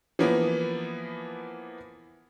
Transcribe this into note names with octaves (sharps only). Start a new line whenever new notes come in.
E3 F3 A#3 B3